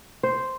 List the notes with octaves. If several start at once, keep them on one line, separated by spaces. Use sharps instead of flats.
C5